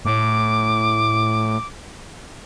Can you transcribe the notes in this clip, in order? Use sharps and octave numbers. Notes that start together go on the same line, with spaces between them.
A2 D6